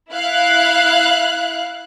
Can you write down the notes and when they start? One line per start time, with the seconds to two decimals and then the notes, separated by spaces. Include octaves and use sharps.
0.11 E4 F5 F#6